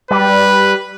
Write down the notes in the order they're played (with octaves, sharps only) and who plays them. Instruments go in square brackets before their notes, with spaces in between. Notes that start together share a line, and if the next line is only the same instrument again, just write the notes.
[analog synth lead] G3 [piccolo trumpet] B4